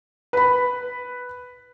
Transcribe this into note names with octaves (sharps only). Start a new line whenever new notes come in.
B4 B5